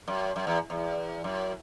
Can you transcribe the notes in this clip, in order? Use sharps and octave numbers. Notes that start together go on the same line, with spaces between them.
F#2
F#2
E2
E2
F#2